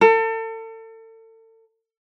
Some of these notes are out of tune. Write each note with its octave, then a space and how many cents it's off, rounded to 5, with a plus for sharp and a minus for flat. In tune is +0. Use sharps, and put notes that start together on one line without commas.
A4 +35